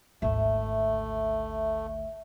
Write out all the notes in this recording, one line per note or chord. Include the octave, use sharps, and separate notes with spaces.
G#1 D2 A3 E5